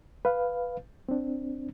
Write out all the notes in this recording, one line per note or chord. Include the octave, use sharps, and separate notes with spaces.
B4 F5
C4 D4